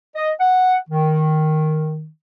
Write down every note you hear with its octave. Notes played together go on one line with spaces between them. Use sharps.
D#5
F#5
D#3